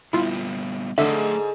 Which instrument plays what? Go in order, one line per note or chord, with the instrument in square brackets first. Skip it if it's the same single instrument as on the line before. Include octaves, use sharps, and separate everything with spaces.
[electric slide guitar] A#2 G3 B3 [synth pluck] E4 F4
[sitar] G#2 [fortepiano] D3 [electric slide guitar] A3 A4 D#5 [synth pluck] E5